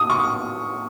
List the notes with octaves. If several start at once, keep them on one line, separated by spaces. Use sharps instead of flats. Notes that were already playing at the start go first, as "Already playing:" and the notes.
Already playing: D#6
C#6